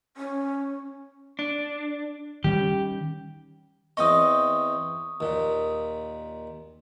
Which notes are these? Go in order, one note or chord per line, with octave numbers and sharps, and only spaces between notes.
C#4
D4
D#3 G3 C#4 G4
E2 C4 D#5 C#6 D#6
D#2 A#2